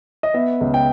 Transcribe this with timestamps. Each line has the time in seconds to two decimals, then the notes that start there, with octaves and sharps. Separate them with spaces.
0.23 D#5
0.34 B3 E5
0.61 C#2
0.74 G5